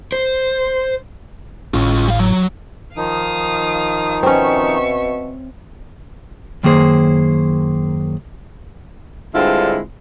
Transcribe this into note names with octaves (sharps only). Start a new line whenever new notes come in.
C5
G#1 A2 C#4 F4
G3 F5
F#3
D#3 F3 D#4 F5 D#6
B2 C4 C#4 E5 C#6
F#2 D#3 A#3 G#4 C5
G2 D3 G#3 C4 E4 F4